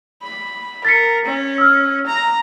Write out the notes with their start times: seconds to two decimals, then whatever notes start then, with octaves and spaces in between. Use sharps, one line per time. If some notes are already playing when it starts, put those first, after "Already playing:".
0.23 B5
0.85 A#4 A6 B6 C#7
1.25 C#4
1.58 E6 F6
2.07 A#5